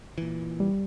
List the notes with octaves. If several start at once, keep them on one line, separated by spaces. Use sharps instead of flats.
A#2 E3
G3